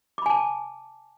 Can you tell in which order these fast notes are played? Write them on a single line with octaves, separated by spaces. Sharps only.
D6 B5 G#5 A5